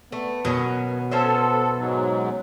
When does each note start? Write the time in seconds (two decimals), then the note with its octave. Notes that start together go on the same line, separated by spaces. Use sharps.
0.12 A3 B3
0.45 B2 D#3 F#3 C#4
1.11 C#4 A4 C5 E5
1.77 G#2 F#3